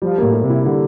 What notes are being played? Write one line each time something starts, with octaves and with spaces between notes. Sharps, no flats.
F3 G3
A2 A#3
G3
C3
E4
D3 G3